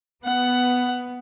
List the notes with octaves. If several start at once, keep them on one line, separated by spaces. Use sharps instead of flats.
B3 F#5